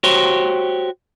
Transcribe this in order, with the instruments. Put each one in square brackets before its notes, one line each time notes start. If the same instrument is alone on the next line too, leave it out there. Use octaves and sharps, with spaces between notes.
[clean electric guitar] F#4 G4 C5 C#5